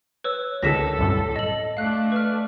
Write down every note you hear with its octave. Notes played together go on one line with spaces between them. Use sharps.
B4 C#5 E6
C#2 D3 D#3 A4 A#6 B6 E7
C2 F#2 A2
D#5 F#7
A3 D4 F5 F#6
B4 F6